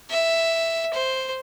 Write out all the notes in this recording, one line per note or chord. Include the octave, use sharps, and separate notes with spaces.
E5
C5